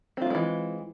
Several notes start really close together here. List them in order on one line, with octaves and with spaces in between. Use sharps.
C4 F4 A#3 G#3 E3